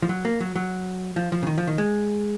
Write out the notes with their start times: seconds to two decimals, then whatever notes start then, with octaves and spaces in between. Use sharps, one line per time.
0.02 F3
0.09 F#3
0.25 A#3
0.40 F#3
0.55 F#3
1.16 F3
1.32 F3
1.43 C#3
1.47 D#3
1.58 F3
1.67 D#3
1.78 G#3